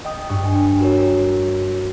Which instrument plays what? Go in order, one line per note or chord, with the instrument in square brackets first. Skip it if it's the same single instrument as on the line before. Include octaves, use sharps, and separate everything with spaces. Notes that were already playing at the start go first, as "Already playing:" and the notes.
[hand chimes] D#5 G5 D#6
[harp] G2 [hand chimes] C#6
[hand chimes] G5 G#5
F#4 A#4 C#5